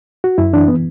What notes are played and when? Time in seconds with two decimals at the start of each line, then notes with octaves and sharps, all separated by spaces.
0.24 F#4
0.38 F#2 E4
0.53 E3 D4
0.68 B3